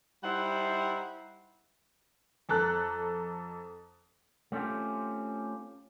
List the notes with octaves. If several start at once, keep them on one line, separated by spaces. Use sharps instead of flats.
G3 D#4 E4 C5 E5 F#5
F2 A4 A#5 F#6
A3 C4 C#4 F4 G4